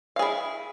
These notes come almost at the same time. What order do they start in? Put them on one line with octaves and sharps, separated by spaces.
F5 G#4 E4